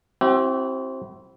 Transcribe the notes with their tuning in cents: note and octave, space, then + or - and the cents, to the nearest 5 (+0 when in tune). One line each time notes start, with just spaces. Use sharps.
C4 +15 E4 +0 G4 -45